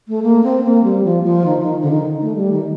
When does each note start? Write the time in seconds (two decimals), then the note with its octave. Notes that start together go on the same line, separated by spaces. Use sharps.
0.08 A3
0.23 A#3
0.44 C4
0.64 A#3
0.84 G3
1.04 F3
1.24 F3
1.46 D#3
1.60 D#3
1.82 D3
1.91 D#3
2.21 A3
2.36 G3
2.52 D#3